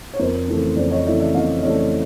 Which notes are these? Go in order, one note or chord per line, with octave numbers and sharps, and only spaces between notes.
C#5
F2 A#4 C5
C#3 E3 A3
F2 C5 D5
C#5 D#5
C#3 E3 A3 D5 E5
D5 E5
F2 D#5 F5
C#3 E3 A3 C#5 D#5